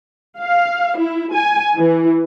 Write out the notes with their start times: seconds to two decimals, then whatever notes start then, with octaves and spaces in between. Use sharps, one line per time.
0.40 F5
0.99 E4
1.35 G#5
1.78 E3